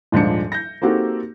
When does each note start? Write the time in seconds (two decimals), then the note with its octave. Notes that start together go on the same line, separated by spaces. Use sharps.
0.12 D#1 G#2 F3 D4 C#7
0.52 G6 A#6
0.82 A#3 C4 D#4 F#4 G4 A4